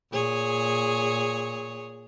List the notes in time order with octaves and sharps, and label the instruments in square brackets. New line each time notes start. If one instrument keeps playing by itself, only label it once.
[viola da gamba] A#2 G#4 C#5